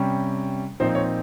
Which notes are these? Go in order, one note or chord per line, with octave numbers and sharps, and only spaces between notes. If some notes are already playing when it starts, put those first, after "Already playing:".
Already playing: C3 G3 C#4
A#2 F3 C4 D#4 C5
C#5